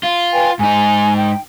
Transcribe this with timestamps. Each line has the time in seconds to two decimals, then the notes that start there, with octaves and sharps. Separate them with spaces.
0.03 F4
0.33 B4 G5 G#5
0.59 G#2 D#4 G#5
1.15 G5